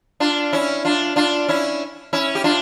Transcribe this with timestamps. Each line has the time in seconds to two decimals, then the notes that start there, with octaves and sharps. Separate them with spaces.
0.20 D4 F4
0.52 C#4 E4
0.85 D4 F4
1.16 D4 F4
1.48 C#4 E4
2.13 C#4 E4
2.35 G4
2.44 D4 F4